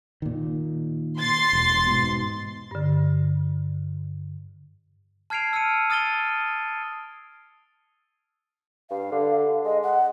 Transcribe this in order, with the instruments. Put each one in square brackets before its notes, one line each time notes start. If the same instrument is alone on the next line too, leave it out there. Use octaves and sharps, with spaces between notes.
[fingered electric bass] A#2 D#3
[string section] C6 A6 C7
[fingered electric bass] E1
G#2 B2
[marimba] G2 D3
[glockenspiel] A5 F6 G#6 C7 D7 F7
E6 F6 C7 C#7 D#7
D#6 F6 A6 D#7 G7
[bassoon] G2 [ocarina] F5
[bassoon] D3
[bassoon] G#3 [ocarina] D#5
[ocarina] F#5